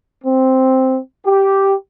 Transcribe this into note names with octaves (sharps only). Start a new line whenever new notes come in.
C4
G4